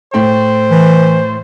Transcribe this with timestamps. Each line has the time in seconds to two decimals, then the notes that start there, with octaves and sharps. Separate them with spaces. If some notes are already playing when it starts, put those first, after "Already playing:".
0.14 A2 A3 C5 G5
0.71 E3